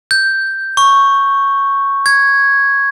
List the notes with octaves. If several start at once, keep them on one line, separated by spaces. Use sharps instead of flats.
G6
C#6
G#6